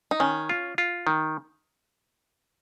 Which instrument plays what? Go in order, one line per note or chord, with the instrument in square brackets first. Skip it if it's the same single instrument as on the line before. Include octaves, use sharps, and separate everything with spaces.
[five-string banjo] D#4
[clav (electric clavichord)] D#3 [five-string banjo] C#4
[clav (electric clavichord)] F4
F4
D#3